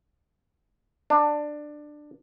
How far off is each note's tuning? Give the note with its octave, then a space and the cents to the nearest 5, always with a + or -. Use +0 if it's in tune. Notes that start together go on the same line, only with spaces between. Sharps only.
D4 +15